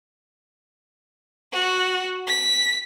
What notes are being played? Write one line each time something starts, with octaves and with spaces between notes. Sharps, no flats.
F#4
B6